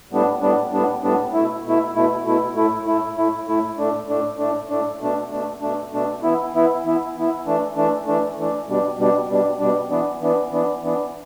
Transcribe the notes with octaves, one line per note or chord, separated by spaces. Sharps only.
A2 G3 B3 D4
A2 G3 B3 D4
A2 G3 B3 D4
A2 G3 B3 D4
B2 A3 E4
B2 A3 E4
B2 A3 E4
B2 A3 E4
A2 A3 E4
A2 A3 E4
A2 A3 E4
A2 A3 E4
A2 A3 D4
A2 A3 D4
A2 A3 D4
A2 A3 D4
B2 A3 D4
B2 A3 D4
B2 A3 D4
B2 A3 D4
E3 B3 E4
E3 B3 E4
E3 B3 E4
E3 B3 E4
E3 A3 D4
E3 A3 D4
E3 A3 D4
E3 A3 D4
B2 G3 D4
B2 G3 D4
B2 G3 D4
B2 G3 D4
E3 B3 D4
E3 B3 D4
E3 B3 D4
E3 B3 D4